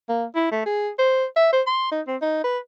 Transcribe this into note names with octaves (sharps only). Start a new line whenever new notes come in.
A#3
E4
A3
G#4
C5
E5
C5
C6
D#4
C4
D#4
B4